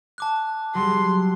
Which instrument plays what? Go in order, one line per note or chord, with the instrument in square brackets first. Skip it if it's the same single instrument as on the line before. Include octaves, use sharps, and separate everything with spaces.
[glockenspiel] A5 D6 F#6
[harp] F#3 G3 [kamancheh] C6